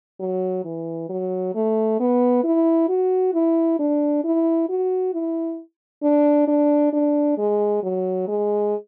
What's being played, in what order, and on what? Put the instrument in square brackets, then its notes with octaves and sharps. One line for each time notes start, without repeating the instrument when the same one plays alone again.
[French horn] F#3
E3
F#3
A3
B3
E4
F#4
E4
D4
E4
F#4
E4
D4
D4
D4
G#3
F#3
G#3